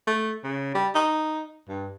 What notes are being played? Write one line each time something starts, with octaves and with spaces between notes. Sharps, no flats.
A3
C#3
G3
D#4
G2